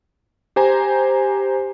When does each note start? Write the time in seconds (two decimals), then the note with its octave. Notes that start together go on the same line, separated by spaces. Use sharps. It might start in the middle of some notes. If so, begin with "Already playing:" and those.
0.56 G4 C5 G#5 A#5